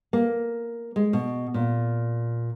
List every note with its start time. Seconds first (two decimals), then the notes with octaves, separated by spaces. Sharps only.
0.13 A#3
0.96 G#3
1.13 B2
1.54 A#2